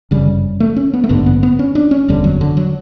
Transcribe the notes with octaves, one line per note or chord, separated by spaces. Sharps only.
G1 F#2 C#3 G3
A3
C#4
B3
A3
A1 G2 D3 B3
B3
B3
C#4
D4
C#4
F#1 E2 D3 G3
F#3
D3
F#3